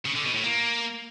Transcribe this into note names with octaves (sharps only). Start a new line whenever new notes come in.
C#3
D3
B2
A2
A#3